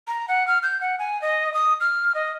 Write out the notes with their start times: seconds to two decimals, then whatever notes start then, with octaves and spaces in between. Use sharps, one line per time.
0.07 A#5
0.28 F#5
0.47 F6
0.63 G6
0.81 F#5
0.99 G#5
1.22 D#5
1.54 D#6
1.80 F6
2.15 D#5